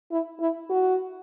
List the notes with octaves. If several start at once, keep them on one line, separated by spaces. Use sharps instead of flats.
E4
E4
F#4